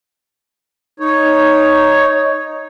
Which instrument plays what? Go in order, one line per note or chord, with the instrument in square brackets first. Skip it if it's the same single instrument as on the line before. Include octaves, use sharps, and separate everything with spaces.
[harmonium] D#4 C#5